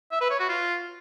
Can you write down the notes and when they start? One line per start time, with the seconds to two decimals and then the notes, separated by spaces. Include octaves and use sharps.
0.12 E5
0.21 B4
0.30 C#5
0.40 F#4
0.49 F4